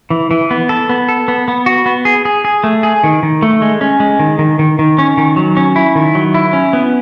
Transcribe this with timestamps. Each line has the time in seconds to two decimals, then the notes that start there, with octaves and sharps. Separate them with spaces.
0.10 E3
0.31 E3
0.51 B3
0.69 A4
0.89 B3
1.09 A4
1.28 B3
1.48 B3
1.66 F#4
1.86 B3
2.05 G#4
2.25 G#4
2.45 G#4
2.64 A3
2.83 G#4
3.04 D#3
3.23 D#3
3.42 A3
3.62 G#3
3.81 C#4
4.00 G#3
4.19 D#3
4.39 D#3
4.59 D#3
4.79 D#3
4.98 C#4
5.17 D#3
5.36 F#3
5.57 C#4
5.76 E4
5.95 D#3
6.15 F#3
6.34 E4
6.53 C#4
6.73 B3